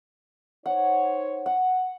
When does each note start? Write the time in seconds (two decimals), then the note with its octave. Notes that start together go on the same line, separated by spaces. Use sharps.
0.66 D#4 C5 C#5 F#5
1.46 F#5